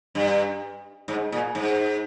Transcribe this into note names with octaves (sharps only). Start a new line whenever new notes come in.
G2
G#2
A#2
G#2